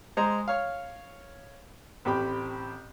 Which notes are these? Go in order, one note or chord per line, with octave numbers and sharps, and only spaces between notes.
G#3 C5 A#5
C#5 F5
A1 C4 G4 B5